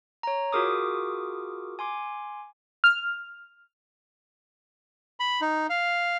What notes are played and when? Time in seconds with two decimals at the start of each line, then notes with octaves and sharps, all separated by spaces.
0.23 C#5 A#5
0.53 F4 F#4 G#4 A#4 D6 D#6
1.79 G#5 C6 D6
2.84 F6
5.20 B5
5.41 D#4
5.70 F5